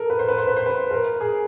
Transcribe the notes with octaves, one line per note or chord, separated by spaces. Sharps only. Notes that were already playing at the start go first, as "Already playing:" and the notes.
Already playing: A4 A#4
B4
C5
B4
C5
B4
C5
B4
A#4
G#4